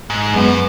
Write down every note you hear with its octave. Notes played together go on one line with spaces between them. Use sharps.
G#2
F#2 G#3 B3